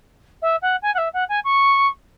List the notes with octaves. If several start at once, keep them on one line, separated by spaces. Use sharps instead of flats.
E5
F#5
G#5
F#5
E5
F#5
G#5
C#6